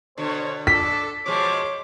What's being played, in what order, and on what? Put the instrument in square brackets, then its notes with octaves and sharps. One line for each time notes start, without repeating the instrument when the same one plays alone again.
[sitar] B2 D3 [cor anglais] C5 [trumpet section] C#5
[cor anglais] D4 [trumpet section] A4 [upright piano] B6
[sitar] B2 F3 G#3 [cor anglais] C#5 [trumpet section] C6 D6